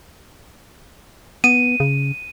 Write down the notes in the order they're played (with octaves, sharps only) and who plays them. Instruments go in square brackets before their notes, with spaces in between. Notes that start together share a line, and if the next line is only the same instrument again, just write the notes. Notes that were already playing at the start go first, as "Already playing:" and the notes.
[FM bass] B3 [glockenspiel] D#7
[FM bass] C#3